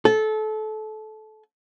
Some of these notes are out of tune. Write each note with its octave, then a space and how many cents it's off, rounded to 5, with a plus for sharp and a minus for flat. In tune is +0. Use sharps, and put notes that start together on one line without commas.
A4 -25